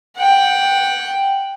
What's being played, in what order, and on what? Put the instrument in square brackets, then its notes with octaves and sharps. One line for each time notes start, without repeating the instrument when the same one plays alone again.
[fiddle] F#5 G5